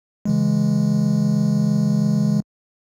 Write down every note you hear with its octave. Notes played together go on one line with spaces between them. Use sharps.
C#3 E3 G#3